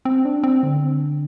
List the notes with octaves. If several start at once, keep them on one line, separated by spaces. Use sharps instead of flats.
C4
D4
C4
D3